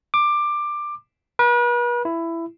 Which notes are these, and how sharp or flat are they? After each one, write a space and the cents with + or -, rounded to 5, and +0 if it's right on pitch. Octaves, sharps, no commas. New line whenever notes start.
D6 +15
B4 -40
E4 +15